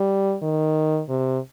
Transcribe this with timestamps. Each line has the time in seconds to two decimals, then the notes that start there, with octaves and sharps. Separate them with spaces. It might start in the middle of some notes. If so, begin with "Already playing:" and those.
Already playing: G3
0.42 D#3
1.09 C3